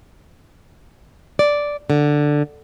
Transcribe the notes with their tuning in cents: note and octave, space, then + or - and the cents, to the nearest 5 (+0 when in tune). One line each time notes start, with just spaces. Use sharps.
D5 -5
D3 +5